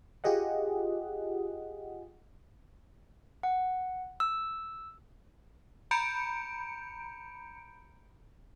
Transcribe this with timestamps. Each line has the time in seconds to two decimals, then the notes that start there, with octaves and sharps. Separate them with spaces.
0.24 F4 G4 G#4 D#5 F#5
3.43 F#5
4.20 E6
5.91 A#5 B5 G6 C#7 D7